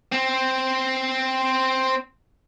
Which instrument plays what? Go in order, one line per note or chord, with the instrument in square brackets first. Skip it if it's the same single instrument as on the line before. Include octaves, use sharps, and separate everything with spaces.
[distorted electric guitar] C4